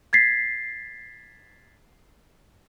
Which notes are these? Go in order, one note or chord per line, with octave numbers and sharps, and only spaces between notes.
G#6 A6 B6 C7